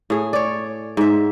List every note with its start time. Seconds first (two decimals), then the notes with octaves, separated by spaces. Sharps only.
0.10 A2 G#4
0.33 C#5 D5
0.97 G#2 E5